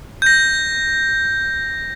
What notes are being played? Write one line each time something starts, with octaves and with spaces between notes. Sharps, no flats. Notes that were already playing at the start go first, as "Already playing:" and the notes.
G6 A#6